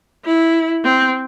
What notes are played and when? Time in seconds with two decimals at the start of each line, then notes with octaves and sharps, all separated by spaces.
0.25 E4
0.84 C4